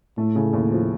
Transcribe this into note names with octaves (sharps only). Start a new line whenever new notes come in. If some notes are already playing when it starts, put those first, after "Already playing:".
A2 A3
C#3
D#2
F3